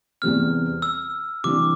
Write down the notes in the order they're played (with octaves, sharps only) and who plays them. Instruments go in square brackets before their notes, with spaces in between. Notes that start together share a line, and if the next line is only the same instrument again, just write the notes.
[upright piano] E2 C3 E3 G3 C4 [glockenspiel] F6
[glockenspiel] E6
[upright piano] C3 E3 G3 D4 [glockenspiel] D6